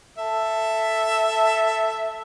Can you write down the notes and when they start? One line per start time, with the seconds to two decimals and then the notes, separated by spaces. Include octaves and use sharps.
0.18 A4 E5